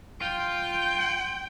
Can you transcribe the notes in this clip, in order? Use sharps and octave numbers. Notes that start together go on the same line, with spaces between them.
F4 G5